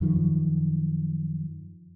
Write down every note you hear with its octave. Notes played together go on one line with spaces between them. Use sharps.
F#2 D#3 F3